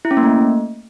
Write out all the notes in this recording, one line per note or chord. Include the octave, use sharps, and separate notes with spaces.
E4
C#4
A#3
A3